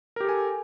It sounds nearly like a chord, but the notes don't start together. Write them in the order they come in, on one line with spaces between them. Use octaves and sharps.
A#4 G4 A4 G#5